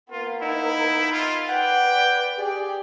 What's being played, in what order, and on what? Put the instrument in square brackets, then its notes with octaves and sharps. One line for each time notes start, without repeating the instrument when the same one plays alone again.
[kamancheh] A#3 B3 [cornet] F4
[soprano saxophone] D#4 [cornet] E4
[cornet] F4 [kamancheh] B5
[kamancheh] B4 D5 [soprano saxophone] F#5 [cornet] G5
[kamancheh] G4 D5 [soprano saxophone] G#4